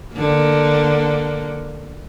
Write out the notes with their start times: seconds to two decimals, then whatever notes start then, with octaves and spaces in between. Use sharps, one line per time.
0.15 D3 A#3